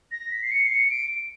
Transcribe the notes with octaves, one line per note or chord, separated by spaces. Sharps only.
A#6
B6
C7
C#7
C7
C#7
D7